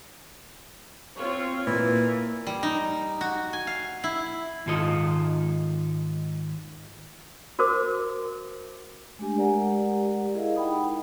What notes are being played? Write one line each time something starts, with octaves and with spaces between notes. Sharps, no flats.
C4 F4 C#5
A#2 E3 A#3
G3
D#4
F#4
G#5
F5
E4
G#2 D#3 G#3 F4 A4 D#5
F#4 A#4 C5 D6
G#3 A3 D4 G4 G#5
G#3 G4 A#4 D5 F#5 A#5
E4 G#4 A#4 D#5 F5
D#4 F#5 G5 B5 D#6